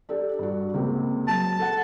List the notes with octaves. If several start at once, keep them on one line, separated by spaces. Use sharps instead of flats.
D4 G4 A4
G2 F#4
C#2 A#3 C4
F#3 A5
A4 F#5